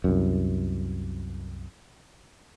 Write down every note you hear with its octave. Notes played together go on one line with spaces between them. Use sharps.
C2 F#2